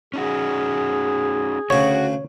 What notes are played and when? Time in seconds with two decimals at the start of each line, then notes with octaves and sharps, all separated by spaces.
0.14 C#4 D#4 F#4 G#4
1.70 D2 C#3 F#4 C#5